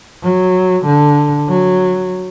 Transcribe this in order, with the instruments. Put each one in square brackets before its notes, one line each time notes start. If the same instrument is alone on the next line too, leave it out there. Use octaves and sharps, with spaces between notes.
[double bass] F#3
D3
F#3